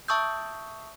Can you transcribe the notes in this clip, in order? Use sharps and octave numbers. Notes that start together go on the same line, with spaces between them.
E5 A5 C#6 D#6 E6 G6